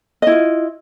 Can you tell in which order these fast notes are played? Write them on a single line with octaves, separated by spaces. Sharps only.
D#5 E4 F4